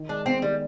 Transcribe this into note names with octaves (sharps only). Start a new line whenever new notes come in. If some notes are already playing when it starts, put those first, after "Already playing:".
Already playing: D#3
G#3 D4
B3 C4
D#3 G3